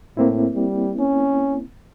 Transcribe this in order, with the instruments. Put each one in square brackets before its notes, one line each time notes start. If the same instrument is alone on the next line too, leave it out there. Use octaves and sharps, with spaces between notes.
[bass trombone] A2 [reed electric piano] A#3 C4 E4
[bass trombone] G3
C#4